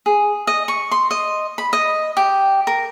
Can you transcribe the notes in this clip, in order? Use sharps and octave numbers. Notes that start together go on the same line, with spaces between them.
G#4
D#5
C#6
C6
D#5
B5
D#5
G4
A#4